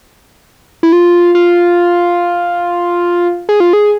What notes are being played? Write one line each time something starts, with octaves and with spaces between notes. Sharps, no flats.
E4
F4
F4
G#4
F4
G#4